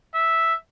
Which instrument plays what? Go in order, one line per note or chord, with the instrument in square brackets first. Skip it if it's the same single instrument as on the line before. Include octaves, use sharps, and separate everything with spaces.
[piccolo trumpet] E5